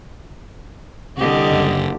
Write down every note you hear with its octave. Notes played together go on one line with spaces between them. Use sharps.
C2 D3 G4 D#5
F#1